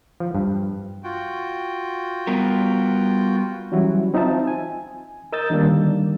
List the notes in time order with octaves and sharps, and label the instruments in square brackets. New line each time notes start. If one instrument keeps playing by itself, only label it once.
[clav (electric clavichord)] F3
G2
[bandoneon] F4 F#4 G5
[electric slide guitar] G3 B3 A#4
[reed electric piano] E3 F#3 G3 C#4 E4 F#4
C4 D#4 F4 C5 E5 A5
G#5
A#4 D#5 E6 G6 A6
D3 D#3 G3 A#3 D4